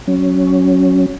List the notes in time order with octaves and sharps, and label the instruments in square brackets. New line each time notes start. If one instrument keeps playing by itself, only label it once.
[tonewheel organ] F#3 C#4